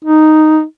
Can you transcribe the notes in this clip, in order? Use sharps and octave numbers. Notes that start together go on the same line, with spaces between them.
D#4